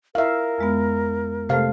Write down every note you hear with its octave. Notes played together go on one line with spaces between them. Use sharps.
E4 A#4 E5 F5
F2 G#3 B3
C3 A3 A4 C5 F5